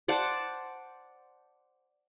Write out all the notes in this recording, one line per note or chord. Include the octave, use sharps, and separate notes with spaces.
C5 D5 F#5 A5